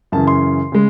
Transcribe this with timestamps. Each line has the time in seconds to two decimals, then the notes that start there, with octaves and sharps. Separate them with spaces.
0.12 F#2 C#3 E3 A5
0.27 C6
0.72 C#3 G#3